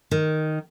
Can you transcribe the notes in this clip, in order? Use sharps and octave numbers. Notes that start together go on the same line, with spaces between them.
D#3